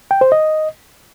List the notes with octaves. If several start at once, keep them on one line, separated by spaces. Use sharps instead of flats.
G5
C5
D#5